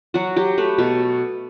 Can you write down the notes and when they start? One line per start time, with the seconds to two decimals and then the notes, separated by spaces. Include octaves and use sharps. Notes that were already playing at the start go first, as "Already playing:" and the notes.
0.14 F#3 F#4
0.36 F#3 G4
0.58 A3 B4
0.78 B2 A4